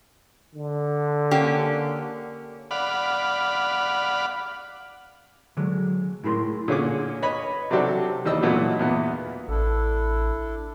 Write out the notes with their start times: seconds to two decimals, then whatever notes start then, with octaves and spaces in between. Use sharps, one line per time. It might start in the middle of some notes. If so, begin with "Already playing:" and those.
0.55 D3
1.31 A#3 C#4 G4
2.71 D5 F5 F#5 B5
5.57 D3 F#3 G#3
6.24 A2 E4 G#4 A#4 C6
6.68 A#2 D3 C#4 G#4 D6
7.22 B4 C#5 D#5 B5
7.71 C3 F#3 D4 F#4 G4 A4
8.25 D#2 E3 G3 D#5 E6
8.42 A#2 E3 F#3 A3 B3
8.79 E2 A#2 B3
9.48 A1 D4 E4 A4